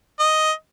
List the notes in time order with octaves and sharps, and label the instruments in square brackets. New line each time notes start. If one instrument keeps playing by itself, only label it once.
[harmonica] D#5